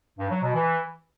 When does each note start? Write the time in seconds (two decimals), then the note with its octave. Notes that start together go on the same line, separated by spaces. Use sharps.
0.18 G2
0.30 F#3
0.42 B2
0.54 E3